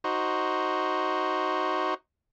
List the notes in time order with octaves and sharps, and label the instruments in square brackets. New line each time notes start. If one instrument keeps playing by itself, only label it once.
[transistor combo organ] D#4 F#4 C5